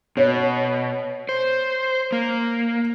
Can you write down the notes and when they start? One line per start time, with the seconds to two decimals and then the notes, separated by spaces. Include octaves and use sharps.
0.17 B2 C#5
1.29 C5
2.12 A#3